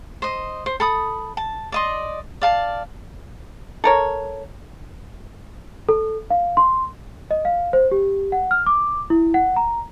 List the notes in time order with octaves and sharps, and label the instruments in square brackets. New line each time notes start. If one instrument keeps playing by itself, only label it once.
[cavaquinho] C5 D#5
C5
A4 B5 D#6
A5
D5 D#5 C6
D5 F5 A5
[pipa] A4 A#4 C#5
[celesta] A4
F5
C6
D#5
F5
C5
G4
F#5
F6
D6
E4
F#5
A#5